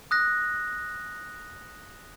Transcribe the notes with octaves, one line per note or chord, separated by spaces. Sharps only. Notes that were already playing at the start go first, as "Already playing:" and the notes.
D#6 F#6 A#6